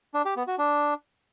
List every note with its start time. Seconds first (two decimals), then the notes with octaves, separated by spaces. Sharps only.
0.14 D4
0.25 G4
0.36 B3
0.47 F#4
0.58 D4